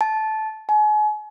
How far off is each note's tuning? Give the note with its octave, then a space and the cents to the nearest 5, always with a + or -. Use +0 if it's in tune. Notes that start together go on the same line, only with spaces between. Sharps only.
A5 -15
G#5 +35